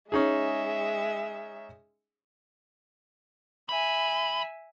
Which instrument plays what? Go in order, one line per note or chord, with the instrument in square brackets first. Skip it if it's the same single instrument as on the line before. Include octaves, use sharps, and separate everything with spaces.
[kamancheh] G#3 E5 [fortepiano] C#4 D#4 G#4
[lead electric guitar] E2 B5 [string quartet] E5 G#5